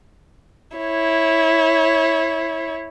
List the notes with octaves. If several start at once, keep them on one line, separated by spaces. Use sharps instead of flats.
E4 C#5